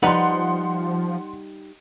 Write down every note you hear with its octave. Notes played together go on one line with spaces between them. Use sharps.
F3 G3 D#4 B4 F#5 C6